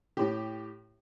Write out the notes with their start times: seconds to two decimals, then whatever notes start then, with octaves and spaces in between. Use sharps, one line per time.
0.17 A2 G4